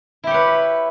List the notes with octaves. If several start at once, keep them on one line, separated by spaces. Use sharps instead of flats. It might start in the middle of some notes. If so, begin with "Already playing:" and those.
E4 G4 B4 C#5